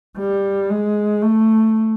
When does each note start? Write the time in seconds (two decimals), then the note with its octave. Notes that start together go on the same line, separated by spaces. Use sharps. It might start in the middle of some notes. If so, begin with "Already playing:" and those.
0.18 G3
0.70 G#3
1.22 A3